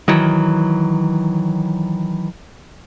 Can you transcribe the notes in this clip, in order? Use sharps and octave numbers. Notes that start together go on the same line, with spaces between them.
D#3 E3 F#3